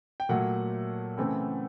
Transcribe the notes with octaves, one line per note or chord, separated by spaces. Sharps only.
G5
A#2 F#3 A3 F#5
C#3 E3 A3 C4